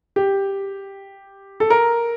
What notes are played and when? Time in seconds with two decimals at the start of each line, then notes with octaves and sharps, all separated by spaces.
0.16 G4
1.60 A4
1.70 A#4